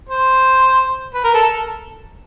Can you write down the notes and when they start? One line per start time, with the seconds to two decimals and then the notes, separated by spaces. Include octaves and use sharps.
0.09 C5
1.14 B4
1.24 A#4
1.34 A4